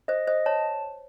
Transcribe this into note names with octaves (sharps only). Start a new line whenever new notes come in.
C5 D#5
C5 D#5
C#5 A5